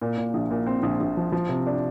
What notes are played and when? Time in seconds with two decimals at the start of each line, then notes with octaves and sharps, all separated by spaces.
0.02 A#2
0.17 A#2
0.34 A#1
0.51 A#2
0.66 C4
0.83 A#1
1.00 A#1
1.17 F3
1.32 F3
1.49 C3
1.66 D4